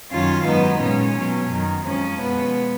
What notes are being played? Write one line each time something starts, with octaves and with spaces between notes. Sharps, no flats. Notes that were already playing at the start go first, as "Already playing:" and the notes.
F#2 D#3 F#3 C#4 F4
G#2 F#3 B3 D#4
A#2 G#3 C#4
B2 F#3
F#2 D#3 F#3
F2 F3 G#3 C#4
B2 G#3 B3